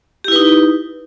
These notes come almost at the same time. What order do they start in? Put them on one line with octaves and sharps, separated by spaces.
G4 E4 B4 D#4